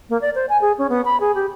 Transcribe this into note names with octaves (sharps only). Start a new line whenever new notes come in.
A#3
D5
C5
G#5
G#4
C#4
B3
B5
G#4
G4